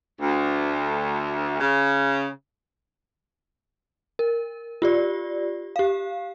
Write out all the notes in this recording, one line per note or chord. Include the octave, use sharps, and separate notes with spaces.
D2
C#3
A#4
F4 G4 D5
G4 F5